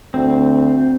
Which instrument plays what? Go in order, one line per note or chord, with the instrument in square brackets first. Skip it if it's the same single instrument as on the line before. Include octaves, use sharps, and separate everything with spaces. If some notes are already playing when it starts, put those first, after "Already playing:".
[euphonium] D2 [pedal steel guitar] C4